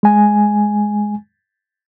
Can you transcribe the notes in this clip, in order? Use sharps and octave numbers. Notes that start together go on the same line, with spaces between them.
G#3 G#5